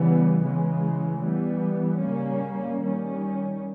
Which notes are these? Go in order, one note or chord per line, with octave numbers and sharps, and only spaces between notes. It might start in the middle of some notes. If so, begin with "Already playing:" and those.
Already playing: C#3 E3 G3 B3
C#3 E3 G#3
E3 G3 B3
C#3 G3 A#3 C#4
D#3 G3 C#4